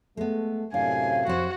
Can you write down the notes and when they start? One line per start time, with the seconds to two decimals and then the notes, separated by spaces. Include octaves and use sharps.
0.17 G#3 A3 B3
0.74 F#2 A2 C3 D4 F5 G#5
1.26 F2 F#4 C5